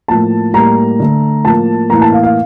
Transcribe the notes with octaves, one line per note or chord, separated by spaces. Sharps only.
A2 F3 A#3 A5
A2 G3 A#3 A#5
D3 A3
A2 F3 A#3 A5
A2 E3 A#3 A#5
A5
F5
F5